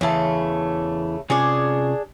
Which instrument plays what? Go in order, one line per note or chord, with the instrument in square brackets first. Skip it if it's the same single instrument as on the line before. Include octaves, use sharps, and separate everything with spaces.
[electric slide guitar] E2 E3 A5 [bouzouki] C#3 A3
[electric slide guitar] C3 C#4 F4 [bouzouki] D4 G#4